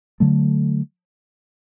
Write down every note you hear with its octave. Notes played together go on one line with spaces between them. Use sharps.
D3 F#3 A3